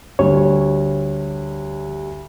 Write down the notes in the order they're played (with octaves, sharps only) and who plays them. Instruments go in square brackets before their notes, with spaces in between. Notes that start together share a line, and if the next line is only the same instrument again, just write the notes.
[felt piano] D2 G3 [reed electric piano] C#5